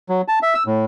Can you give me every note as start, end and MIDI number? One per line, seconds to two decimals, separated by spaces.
0.09 0.21 54
0.28 0.39 81
0.43 0.54 76
0.55 0.63 88
0.67 0.85 45